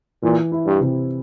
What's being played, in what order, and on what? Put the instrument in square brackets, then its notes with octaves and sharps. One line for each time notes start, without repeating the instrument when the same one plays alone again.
[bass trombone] A#2 [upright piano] E3
[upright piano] E4
[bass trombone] G2
[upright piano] C3